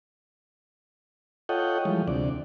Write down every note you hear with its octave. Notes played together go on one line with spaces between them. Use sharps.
F4 A4 C#5 D#5 F#5 G5
E3 F3 G3 G#3
D2 C3 D5